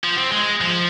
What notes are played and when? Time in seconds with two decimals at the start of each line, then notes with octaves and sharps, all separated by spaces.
0.04 F3
0.18 C4
0.32 G#3
0.61 F3